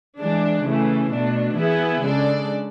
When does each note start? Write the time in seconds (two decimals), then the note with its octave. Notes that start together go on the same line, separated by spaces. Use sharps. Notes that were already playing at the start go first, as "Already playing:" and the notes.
0.19 E3 G#3 D4
0.64 C#3 E3 A3
1.11 B2 A3 D4
1.56 E3 B3 E4 G#4 B4
2.02 C#3 G#3 D4 A4 D5